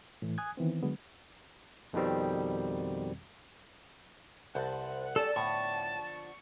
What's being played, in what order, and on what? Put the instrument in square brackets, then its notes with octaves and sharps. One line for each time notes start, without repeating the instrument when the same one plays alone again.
[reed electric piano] A2 E3
G#5 D#6 F#6 G#6
D#3 E3 B3 C4
D3 F#3 G#3 B3
[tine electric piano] F2 B2 D#3 G3 C4
[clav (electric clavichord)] C2 [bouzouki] A4 B4 C5 [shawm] F#5
[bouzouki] G3 C#4 D4 [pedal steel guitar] A4 [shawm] A5
[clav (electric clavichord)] A2 [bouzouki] D3 F3 B3 [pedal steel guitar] C#6